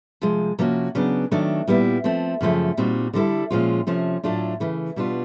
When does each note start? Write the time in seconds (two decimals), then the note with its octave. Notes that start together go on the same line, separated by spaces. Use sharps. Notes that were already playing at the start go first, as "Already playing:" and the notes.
0.21 C3 F3 G#3
0.59 C3 F3 A#3 C#4 F#4
0.95 C#3 F#3 B3 D4
1.31 D#3 F#3 A3 D4
1.67 A#2 G3 B3 E4
2.04 F3 A3 C4
2.41 F#2 C#3 F3 A3
2.77 A#2 G3 C4 D#4 F#4
3.13 D3 G3 B3 E4 A4
3.50 A#2 F3 G#3 C#4 F4
3.87 C3 F3 A3 C#4
4.23 A2 F#3 A3 D4 F4
4.60 C#3 E3 A3
4.96 B2 G3 B3 D4 F4